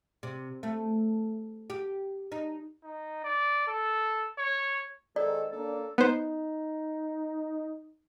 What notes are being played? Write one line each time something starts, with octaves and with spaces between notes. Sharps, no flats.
C3
A3
G4
D#4
D#4
D5
A4
C#5
G#2 D#3 A4 D5
A#3 C#4 D4 A4
B3 D#4 C5